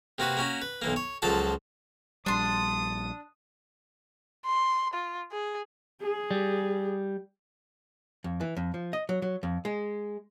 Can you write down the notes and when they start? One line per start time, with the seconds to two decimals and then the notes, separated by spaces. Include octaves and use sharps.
0.18 C3 A#3 F#4 B4
0.37 A#3 C#4 F#4
0.62 B4
0.82 B1 E3 A#3
0.96 C#5
1.22 C#2 F3 F#3 A4 A5
2.26 A#1 G3 D4 C6 D#6
4.46 C6
4.94 F4
5.32 G#4
6.02 G#4
6.31 G3
8.24 F2
8.41 E3
8.56 F2
8.74 F3
8.93 D#5
9.09 F#3
9.22 F#3
9.43 F2
9.65 G#3